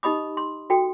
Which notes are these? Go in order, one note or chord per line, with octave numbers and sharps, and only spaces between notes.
D#4 G4 D#5 B5 D#6
C6
F#4 A4 G5